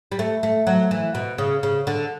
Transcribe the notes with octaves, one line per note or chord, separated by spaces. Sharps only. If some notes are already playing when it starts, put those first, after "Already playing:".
G3
A3
A3
F#3
E3
B2
C#3
C#3
D3